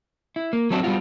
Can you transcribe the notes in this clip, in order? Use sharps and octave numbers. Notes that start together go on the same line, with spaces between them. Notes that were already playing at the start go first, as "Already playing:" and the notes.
E4
A#3
F#3 A3 C4 D4 D#4 F#4
G3 B3 C4 D4 F4 F#4